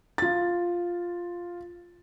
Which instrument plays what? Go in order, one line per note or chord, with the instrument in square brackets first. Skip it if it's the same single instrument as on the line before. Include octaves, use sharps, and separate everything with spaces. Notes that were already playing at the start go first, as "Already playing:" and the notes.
[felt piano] F4 A6